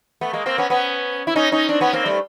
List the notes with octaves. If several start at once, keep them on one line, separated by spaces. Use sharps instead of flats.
A3 B3
G#3 A#3
A#3 C4
B3 C#4
B3 C#4
E4
C#4 D#4
C#4 D#4
C4 D4
B3 C#4
A#3 C4
G3 A3